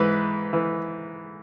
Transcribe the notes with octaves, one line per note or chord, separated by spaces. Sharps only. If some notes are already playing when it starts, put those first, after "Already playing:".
Already playing: G#2 E3 B4
E3